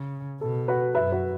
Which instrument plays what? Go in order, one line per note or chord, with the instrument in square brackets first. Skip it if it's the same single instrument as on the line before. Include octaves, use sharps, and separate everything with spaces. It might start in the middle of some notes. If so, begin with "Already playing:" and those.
Already playing: [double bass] C#3
[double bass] B2 [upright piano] A4
[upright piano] F#4 B4
[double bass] F#2 [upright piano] B4 E5
[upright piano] F#4 B4